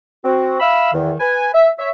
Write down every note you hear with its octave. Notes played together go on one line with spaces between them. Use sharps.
C4 F#4
E5 F5 B5 E6
E2 D#3
B4 G#5
E5
C#5 E5